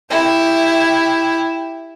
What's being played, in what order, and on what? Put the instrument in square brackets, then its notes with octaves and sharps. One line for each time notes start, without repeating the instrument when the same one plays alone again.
[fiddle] E4 G4